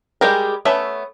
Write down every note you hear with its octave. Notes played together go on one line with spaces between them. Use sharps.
G3 G#3 G4 G#4 A#4
A3 B3 C#4 E5